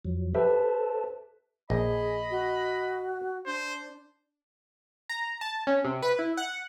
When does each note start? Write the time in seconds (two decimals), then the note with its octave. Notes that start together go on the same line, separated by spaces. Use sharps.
0.05 F2 F3 F#3
0.34 G4 A4 B4 C5 E5 A5
1.70 A#1 G#4 D#5 B5
2.30 F#4
3.46 D4 C5
5.09 A#5
5.41 A5
5.67 C#4
5.84 C3
6.02 B4
6.19 E4
6.37 F#5